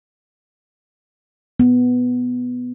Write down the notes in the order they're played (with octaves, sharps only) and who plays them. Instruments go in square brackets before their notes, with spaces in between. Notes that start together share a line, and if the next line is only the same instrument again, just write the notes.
[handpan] B3